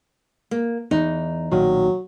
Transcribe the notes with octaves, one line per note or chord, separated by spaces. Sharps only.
A#3
E2 D#4
B1 A#2 D#3 F#3